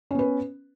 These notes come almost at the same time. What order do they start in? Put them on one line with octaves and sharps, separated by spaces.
C#4 B3 B4